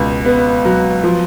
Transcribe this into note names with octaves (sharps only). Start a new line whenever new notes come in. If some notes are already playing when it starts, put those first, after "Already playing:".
Already playing: C#2 B2
B3
F#3
F3